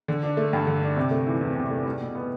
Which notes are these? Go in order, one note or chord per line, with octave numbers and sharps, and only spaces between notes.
D3
D4
A3
G2
D3
D4
C3
A3
E3
E2
C3
A3
G3
B2
B3